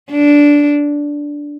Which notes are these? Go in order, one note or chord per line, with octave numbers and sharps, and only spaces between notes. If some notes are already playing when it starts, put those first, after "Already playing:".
D4